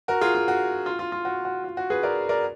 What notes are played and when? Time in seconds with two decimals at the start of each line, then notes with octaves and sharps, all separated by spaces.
0.08 F#4 A#4
0.21 F4 G#4
0.35 F4
0.48 F#4
0.86 F4
0.99 F4
1.12 F4
1.25 F#4
1.45 F#4
1.64 F4
1.77 F#4
1.90 G#4 B4
2.03 A#4 D5
2.29 A#4 D5